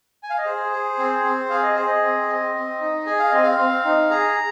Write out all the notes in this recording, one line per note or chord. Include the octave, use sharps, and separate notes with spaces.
G#5
F5
D#5
G#4 C5
G#4
C4
C4
G#4 F5
D#5
G#4 C5
D#5
C4
C4
C4
D#4
G#4 G#5
F5
C4 D#5
F5
C4
D#4
G#4 A#5